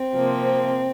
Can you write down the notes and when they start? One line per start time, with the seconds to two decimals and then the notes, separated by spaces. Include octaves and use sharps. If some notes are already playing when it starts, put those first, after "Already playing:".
Already playing: C4
0.14 C3 F3 A#3